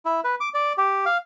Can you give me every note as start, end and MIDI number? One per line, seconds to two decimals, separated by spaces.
0.05 0.20 64
0.24 0.35 71
0.40 0.49 86
0.54 0.73 74
0.78 1.05 67
1.06 1.17 77